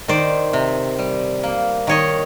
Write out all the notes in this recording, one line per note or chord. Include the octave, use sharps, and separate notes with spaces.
D#3 C5 D5
C3
G3
A#3
D#3 C#5 D#5